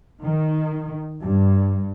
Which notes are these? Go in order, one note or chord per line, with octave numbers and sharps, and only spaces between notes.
D#3
G2